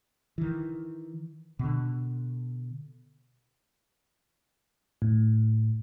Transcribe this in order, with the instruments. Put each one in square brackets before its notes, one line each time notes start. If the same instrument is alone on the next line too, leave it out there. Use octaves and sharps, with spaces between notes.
[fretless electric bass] D#3 E3
B2 D3
[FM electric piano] A2